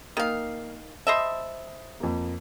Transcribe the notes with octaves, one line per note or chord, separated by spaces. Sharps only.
D#3 A#3 F5
C5 D#5 E5 A5 B5 D#6
F2 A#3